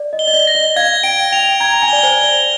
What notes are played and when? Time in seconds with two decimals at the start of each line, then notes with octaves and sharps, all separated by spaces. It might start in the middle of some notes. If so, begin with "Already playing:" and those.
Already playing: D5
0.13 D#5
0.19 G7
0.28 D#5
0.34 D5
0.47 A#6
0.55 D#5
0.76 F5 G#6
1.04 G5 D7
1.32 G5 F7
1.60 A#5 G#6
1.82 G#5
1.88 D5 G7
2.03 C5
2.17 G7
2.23 D5